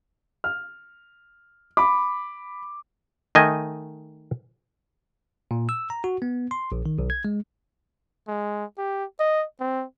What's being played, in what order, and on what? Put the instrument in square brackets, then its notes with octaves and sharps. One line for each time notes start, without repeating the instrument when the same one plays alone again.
[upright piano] F6
B5 D6
[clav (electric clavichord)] D#3 A3 D#5 G#5
[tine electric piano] A#2
E6
A#5
F#4
B3
C6
A#1
D#3
B1
G#6
G#3
[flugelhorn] G#3
G4
D#5
C4